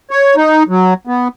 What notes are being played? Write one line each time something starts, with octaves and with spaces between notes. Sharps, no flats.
C#5
D#4
F#3
B3